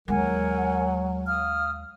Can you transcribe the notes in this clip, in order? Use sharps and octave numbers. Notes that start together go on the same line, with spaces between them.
D#2 F#3 G#3 A#4 F#5 G#5
F5 D#6 F6